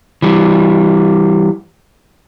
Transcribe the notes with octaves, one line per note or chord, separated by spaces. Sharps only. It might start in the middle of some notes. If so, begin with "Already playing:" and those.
E3 G3